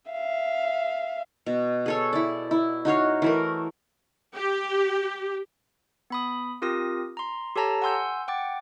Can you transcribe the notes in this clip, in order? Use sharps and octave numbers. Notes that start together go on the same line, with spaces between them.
E5 F5
B2
G#4 A4 C#5
E4 D5
E4
D#4 F#4 C#5 F5
E3 A3 A#4
G4
B3 B5 D#6
C4 F4 G4 A#4 D#6 A#6
A#5 C6
G4 A4 C#5 A5 A#5 A#6
F#5 G#5 C6 E6 G6
F#5 G5 D6 A6